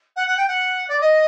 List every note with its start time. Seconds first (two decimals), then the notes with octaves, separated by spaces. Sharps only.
0.16 F#5
0.27 F#5
0.37 G5
0.47 F#5
0.88 D5
1.00 D#5